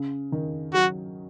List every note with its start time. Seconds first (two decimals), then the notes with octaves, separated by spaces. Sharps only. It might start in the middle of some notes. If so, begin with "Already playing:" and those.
Already playing: C#3
0.32 D#3
0.74 F#3 F#4